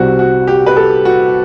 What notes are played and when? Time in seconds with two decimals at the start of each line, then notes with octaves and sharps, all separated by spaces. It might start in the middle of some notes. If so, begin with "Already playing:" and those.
Already playing: C2 C3 G3 C4 F#4
0.19 F#4
0.47 G4
0.66 B4
0.76 A4
1.05 F#4